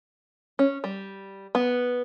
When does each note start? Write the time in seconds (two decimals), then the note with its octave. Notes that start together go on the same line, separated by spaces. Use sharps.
0.59 C#4
0.84 G3
1.55 B3